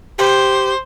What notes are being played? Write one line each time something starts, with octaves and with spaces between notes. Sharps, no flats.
G4 C5